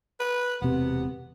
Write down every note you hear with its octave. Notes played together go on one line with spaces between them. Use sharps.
B4
E1 C3 B3